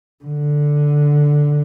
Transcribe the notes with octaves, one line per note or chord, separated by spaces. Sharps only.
D3